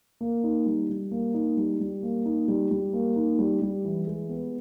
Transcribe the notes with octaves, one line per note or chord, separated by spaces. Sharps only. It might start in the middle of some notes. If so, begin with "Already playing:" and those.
A#3
D#4
G3
G3
A#3
D#4
G3
G3
A#3
D#4
G3
G3
A#3
D#4
G3
G3
E3
G#3
B3